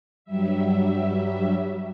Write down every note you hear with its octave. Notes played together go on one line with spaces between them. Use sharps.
G2 F#3 G3 E5